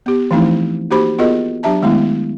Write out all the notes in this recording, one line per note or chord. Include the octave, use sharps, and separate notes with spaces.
B3 G4
E3 F3 A3 C4 D#4 E4
A#3 D#4 F#4 G4 C5 B5
B3 F4 F#4 G#4 A#4 D#5
F#3 D4 G4 E5 A5 A#5
D#3 G#3 A3 B3 E4